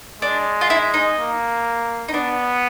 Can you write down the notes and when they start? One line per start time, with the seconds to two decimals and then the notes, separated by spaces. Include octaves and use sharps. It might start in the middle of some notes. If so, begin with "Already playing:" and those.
0.22 G#3 D4
0.61 F4
0.70 E4
0.94 D#4
1.18 A#3
2.08 D#4
2.14 B3 D4